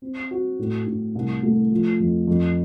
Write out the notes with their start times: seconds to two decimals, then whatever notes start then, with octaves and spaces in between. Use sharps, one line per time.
0.02 C4
0.31 F#4
0.59 A2
0.87 A2
1.15 C2
1.43 A3
1.71 F3
2.00 F2
2.27 F2